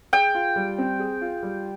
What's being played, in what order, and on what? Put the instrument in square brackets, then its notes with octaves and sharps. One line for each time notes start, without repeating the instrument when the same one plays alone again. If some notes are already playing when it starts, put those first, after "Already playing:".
[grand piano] G#4 [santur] G5
[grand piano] F4
G3
C4
G#4
F4
G3